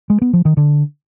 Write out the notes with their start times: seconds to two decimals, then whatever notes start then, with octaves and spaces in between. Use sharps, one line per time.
0.10 G#3
0.22 B3
0.33 F3
0.45 D#3
0.57 D3